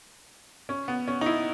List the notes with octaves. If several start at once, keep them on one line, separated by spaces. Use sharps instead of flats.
C#4
B3
C#4
D#4
E4